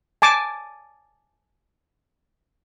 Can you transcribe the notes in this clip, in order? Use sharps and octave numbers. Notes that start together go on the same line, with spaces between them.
G#5 A5 D6